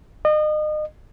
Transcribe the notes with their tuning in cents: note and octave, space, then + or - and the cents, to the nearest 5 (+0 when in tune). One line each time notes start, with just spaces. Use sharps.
D#5 -35